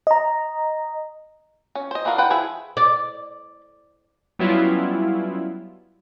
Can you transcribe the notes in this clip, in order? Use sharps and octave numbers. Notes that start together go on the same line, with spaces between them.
D#5 A#5
C#4
C5 D#5
E3 D4 F#4 A#4 F5
F4 B4 F#5 G5
F3 E4 G#4 E5
D5
F#3 G3 B3 C#4 E4 F4